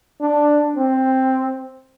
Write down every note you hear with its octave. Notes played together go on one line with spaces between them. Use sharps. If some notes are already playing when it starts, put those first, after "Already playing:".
D4
C4